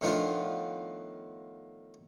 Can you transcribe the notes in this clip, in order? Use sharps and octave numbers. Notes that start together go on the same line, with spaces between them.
A2 D#3 F3 B3 D4 F4